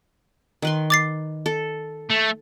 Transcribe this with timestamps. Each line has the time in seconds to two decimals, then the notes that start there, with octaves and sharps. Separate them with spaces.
0.62 D#3 B4 C6
0.90 D6 A6 C7
1.46 A4
2.10 A3